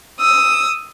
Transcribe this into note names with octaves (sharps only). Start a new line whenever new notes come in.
D#6 E6